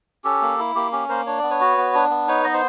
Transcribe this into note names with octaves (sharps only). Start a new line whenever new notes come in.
C#4 G4 A4
A#3
E4
A#3 G4
C#4 G4
A#3 A#4 C5
D4 C#5
B3 D5
B4 C#5
F#4
B3
D4
B3
D#4 B4 C#5
B3 D#5
C5